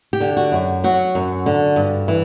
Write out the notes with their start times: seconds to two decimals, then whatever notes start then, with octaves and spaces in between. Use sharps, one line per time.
0.13 G4
0.21 D3
0.37 F#4
0.52 F#2
0.84 F#3 F#4
1.15 F#2
1.46 D3
1.76 G2
2.08 E3